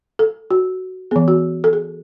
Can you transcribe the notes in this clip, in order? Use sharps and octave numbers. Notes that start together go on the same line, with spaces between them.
A4
F#4
E3 B3 G#4
F#4
A4
G#4